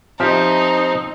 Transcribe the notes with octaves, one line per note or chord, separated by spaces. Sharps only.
F3 C4 D#4 G4 E5